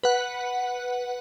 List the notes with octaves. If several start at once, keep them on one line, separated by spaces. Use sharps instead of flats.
B4 F#5